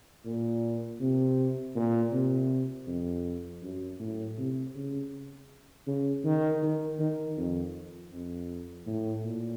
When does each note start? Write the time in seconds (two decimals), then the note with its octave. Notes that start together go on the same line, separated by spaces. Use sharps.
0.25 A#2
1.00 C3
1.75 A#2
2.12 C3
2.87 F2
3.62 F#2
3.99 A2
4.37 C3
4.75 C#3
5.87 C#3
6.24 D#3
6.62 D#3
6.99 D#3
7.37 F2
8.12 F2
8.87 A2
9.24 A#2